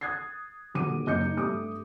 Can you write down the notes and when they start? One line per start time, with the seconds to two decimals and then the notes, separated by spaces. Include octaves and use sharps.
0.01 D#6 F#6 G#6 A6 C7
0.74 D#1 D3 F#4 D6 D#7
1.06 F#1 D#5 D6 G6 C#7
1.20 D#4
1.37 G2 A3 D6 D#6